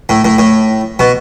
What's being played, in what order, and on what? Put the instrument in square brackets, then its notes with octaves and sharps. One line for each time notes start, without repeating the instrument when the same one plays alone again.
[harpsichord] A2
A2
A2
B2